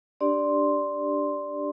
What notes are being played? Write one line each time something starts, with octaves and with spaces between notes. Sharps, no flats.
D4 G4 D5 C6